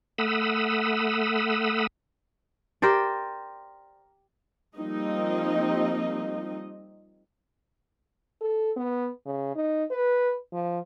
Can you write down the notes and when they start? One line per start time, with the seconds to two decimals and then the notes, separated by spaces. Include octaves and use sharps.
0.18 A3 F#5 B5 D#6 E6
2.82 G4 A#4 C5 D5
4.76 F3 G3 A#3 C4 D#4 D#5
8.41 A4
8.77 B3
9.26 C#3
9.56 D#4
9.91 B4
10.53 F3